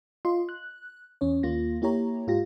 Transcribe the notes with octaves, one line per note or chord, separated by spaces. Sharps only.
F4 D#5 C6
F#6
E2 C#4 C#5
D#2 A#3 F4 A#6
A#3 E4 G4 C#5 A#5
G#2 F4 G4 A#6